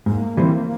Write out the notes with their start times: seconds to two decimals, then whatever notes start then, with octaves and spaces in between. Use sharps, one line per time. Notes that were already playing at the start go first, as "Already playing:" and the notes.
0.06 G#2 A#3
0.37 E3 G3 C4